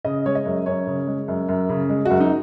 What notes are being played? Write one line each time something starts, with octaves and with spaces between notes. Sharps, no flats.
C#3 D#5
G#3 C#5
D#5
F#2
F#2 C#5
C#3
G#3
F#2
F#2
C#3
G#3
F#2 F#4
D#4